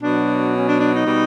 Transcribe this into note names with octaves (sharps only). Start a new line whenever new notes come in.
B2 F#3 D4
C#4
D4
D4
D#4
B2 G3